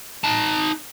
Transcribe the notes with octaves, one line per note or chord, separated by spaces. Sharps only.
D#4 A5